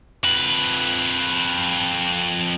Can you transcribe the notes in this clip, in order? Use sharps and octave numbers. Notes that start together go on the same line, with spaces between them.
F2 B4